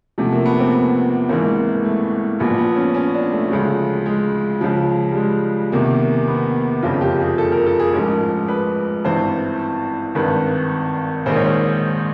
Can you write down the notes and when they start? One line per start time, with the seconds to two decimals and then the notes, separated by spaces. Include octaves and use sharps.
0.18 E2 C3 F3 A3
0.32 A#3
0.46 B3
0.59 C4
0.74 B3
1.29 G#1 G#2 E3 A#3
1.85 A3
2.40 A#1 A#2 F3 B3
2.58 B3
2.76 C#4
2.94 C#4
3.14 D4
3.32 A3
3.50 D2 C#3 F3 G#3
4.06 G#3
4.61 C#2 C#3 F3
5.12 G3
5.16 G#3
5.72 E2 C3 D#3 A#3
6.28 B3
6.83 F#1 F2 C#3 F3 F4
7.01 G4
7.20 G#4
7.38 A4
7.52 A#4
7.66 A4
7.79 G#4
7.93 A1 G#2 F3 A#4
8.48 B4
9.04 G#1 G2 E3 C5
10.15 G#1 G2 D#3 B4
11.26 A#1 G#2 D#3 C5
11.36 C#5
11.45 C5